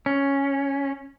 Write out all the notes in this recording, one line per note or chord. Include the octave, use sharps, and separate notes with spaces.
C#4